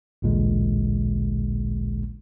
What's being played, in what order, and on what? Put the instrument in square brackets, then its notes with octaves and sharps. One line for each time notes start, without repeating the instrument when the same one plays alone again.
[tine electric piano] A1 D2 A#2 D3 G#3